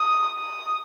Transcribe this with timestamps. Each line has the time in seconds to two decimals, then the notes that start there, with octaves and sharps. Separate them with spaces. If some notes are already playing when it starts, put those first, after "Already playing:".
Already playing: D#6
0.39 D#6